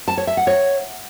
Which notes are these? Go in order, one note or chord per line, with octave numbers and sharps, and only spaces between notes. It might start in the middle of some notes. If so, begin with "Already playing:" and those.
A5
C#5
E5
F#5
C#5